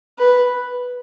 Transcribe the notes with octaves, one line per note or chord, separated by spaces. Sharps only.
B4